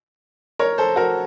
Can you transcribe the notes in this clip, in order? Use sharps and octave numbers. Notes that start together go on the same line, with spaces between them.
A#4 C#5
A4 C5
F#4 A#4